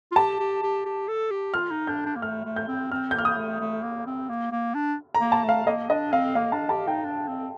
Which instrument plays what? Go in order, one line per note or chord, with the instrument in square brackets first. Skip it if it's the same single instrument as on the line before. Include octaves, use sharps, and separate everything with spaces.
[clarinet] F4
[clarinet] G4 [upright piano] A5
[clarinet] G4
G4
G4
A4
G4
[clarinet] F4 [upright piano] F6
[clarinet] D#4
[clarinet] D4 [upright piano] G6
[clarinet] D4
A#3
[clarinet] A3 [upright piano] F6
[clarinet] A3
[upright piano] G6
[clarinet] C4
[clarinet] C4 [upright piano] F6
[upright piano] G6
[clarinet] A#3 [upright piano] F6
[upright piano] D#6
[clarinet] A3
A3
A#3
C4
A#3
A#3
D4
[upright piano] A#5
[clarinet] A#3
[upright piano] A5
[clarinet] A3
[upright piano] F5
[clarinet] A#3 [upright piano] D#5
[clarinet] D4 [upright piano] D#5
[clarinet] C4 [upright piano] F5
[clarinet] A#3 [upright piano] F5
[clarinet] D4 [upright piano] A5
[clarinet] G4 [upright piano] A5
[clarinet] D#4 [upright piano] G5
[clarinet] D4
C4